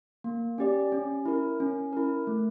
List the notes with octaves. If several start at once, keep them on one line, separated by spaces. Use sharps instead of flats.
A#3
C#4 G4 D5
C#4
E4 A#4
C#4
E4 A#4
A3